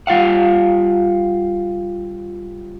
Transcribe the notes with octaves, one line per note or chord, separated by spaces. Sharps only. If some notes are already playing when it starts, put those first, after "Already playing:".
G3 F4 F5 F#5